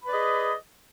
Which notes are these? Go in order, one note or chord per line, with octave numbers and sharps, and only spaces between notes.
G#4 B4 D5 D#5 B5